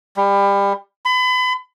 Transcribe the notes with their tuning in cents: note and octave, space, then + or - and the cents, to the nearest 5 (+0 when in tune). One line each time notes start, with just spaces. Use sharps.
G3 +25
B5 +35